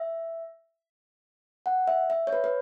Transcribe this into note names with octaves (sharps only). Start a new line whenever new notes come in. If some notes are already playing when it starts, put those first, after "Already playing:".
Already playing: E5
F#5
E5
E5
C#5
B4
B4